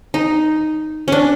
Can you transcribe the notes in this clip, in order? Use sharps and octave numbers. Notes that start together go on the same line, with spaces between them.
D#4
C#4 D4